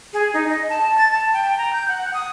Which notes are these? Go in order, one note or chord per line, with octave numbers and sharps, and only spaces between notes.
G#4
D#4
D#5
A5
A6
A5
G5
A#5
G6
F#5
D#6